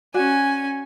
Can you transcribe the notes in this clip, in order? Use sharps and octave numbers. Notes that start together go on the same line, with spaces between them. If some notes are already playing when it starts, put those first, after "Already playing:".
C#4 F#4 D5 G#5